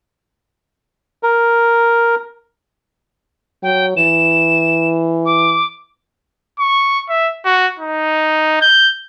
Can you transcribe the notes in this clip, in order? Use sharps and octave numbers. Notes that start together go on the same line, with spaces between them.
A#4
F#3 G5
E3 E7
D6
C#6
E5
F#4
D#4
G6